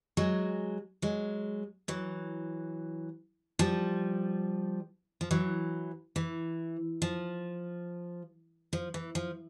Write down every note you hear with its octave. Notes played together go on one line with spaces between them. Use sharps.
F#3 G#3
F#3 G#3
E3 F#3
F3 G3
F3
E3 F#3
E3
F3
F3
E3
F3